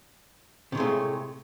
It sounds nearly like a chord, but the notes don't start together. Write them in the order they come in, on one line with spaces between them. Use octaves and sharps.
C3 A2 G#3 A3